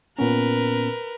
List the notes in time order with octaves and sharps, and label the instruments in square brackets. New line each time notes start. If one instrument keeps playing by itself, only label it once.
[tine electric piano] A#2 B3 C#4 [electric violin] A#4 B4